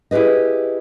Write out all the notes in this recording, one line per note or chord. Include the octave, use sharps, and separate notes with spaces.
E4 G4 G#4 B4 D#5